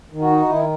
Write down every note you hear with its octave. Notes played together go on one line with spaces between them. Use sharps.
D#3
F#4
D#4
D#3 E4